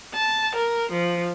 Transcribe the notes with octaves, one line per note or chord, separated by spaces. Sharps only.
A5
A#4
F3